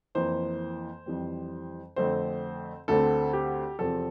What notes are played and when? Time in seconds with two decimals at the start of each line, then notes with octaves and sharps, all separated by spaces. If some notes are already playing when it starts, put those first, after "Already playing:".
0.15 F2 E3 A#3 C5
1.06 F2 E3 G3 C4
1.96 F2 D3 A3 C4 C5
2.88 D2 D3 A3 C4 A4
3.33 G4
3.79 E2 C3 F3 C4 A4